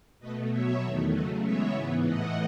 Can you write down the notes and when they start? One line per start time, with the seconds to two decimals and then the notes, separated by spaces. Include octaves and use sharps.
0.20 B2 A3 B4 D#5
0.50 B2 F#3 B3 C#5 E5
0.82 E2 D#3 A3
1.11 C#3 F#3 A3 B4 D#5
1.42 C#3 E3 G#3 B3 C#5 E5
1.73 G#2 E3 B3
2.03 A2 E3 A3 D#5 F#5